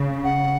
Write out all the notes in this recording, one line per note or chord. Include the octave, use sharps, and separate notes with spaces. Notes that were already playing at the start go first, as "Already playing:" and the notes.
Already playing: C#3
F#5